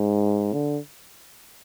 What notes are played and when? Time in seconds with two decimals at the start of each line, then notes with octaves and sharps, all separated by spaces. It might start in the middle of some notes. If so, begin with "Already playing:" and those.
Already playing: G#2
0.53 D3